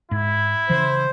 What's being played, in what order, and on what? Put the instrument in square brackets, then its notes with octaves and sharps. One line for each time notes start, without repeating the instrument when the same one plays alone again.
[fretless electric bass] G#2 [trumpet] E4
[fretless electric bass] C#3 E3 [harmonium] C5